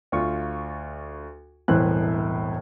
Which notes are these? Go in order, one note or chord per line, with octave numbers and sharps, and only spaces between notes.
D2 F4 C#6
E1 C2 A2 E3 C5 F#6